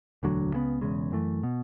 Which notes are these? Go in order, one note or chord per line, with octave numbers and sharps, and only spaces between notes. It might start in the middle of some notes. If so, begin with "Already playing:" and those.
E1 D2 D3 F#3
C#2 C#3 G#3 B3
E1 E2 C#3 G#3
F#2 E3 A3
B2